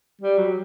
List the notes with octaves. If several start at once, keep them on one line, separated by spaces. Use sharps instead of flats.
G3
F#3